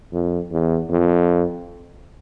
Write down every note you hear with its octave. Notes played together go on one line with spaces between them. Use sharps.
F2
E2
F2